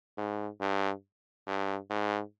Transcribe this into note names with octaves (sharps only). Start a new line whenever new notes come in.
G#2
G2
G2
G#2